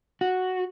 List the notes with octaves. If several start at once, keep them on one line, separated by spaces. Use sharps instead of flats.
F#4